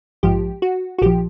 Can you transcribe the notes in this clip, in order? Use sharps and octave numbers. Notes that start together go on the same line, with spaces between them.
A#1 G#2 F3 G4
F#4
F#4
A#1 F3 G4